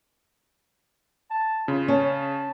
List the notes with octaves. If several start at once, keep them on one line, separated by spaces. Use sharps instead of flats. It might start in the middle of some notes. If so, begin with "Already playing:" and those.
A5
C#3 F4
C#4 A5